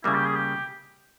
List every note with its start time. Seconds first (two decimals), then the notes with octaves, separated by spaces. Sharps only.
0.04 C#3 G3 A#3 E4
0.15 G4
0.26 G#4
0.36 G4